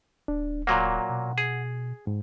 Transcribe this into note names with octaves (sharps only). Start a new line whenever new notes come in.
D1 D4
A#2 F#3 A#3 F#5
B2
G#4
G#2